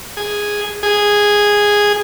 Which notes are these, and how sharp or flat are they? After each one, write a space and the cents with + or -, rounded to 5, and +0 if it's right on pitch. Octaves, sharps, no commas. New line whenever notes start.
G#4 -5
G#4 -10